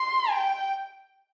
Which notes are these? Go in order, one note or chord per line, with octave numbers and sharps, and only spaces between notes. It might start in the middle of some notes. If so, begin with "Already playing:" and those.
Already playing: C6
G5